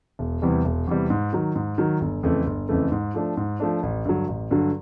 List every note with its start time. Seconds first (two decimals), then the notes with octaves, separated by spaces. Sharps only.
0.19 E1
0.42 E2 C3 E3 G3
0.65 E1
0.87 E2 C3 E3 G3
1.10 G#2
1.33 D#3 F#3
1.55 G#2
1.78 D#3 F#3
2.01 G1
2.23 F2 C#3 E3 A3
2.46 G1
2.69 F2 C#3 E3 A3
2.92 G#2
3.15 F3 A3 D4
3.37 G#2
3.60 F3 A3 D4
3.83 A1
4.05 G2 D3 F#3
4.28 A1
4.51 G2 D3 F#3